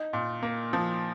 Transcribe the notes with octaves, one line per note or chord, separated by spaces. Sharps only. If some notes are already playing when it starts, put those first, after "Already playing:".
Already playing: D#4
A#2
A#3
F3